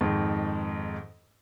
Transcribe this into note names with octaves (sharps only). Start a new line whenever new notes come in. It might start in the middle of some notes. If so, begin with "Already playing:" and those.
F2 G#2 D#3